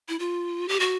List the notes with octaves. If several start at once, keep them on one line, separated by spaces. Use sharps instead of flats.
E4
F4
G4
F#4